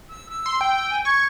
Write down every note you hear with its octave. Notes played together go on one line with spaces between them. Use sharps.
E6
E6
C6
G5
G#5
C#6 G#6